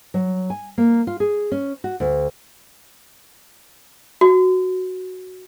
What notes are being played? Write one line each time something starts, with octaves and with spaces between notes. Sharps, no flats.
F#3
G#5
A#3
F4
G#4
C#4
F#4
D2
F#4